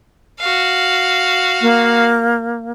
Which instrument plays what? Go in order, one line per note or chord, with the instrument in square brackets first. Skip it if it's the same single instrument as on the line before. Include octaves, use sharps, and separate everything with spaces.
[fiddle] F#4 F5
[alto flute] A#3